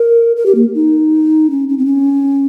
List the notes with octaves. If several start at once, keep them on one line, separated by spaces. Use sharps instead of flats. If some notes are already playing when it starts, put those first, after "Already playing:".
Already playing: A#4
A#4
G4
A#3
D#4
C#4
C#4
C4
C#4